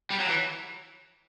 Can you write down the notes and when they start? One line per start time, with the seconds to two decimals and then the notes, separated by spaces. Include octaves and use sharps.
0.10 G3
0.20 F#3
0.29 E3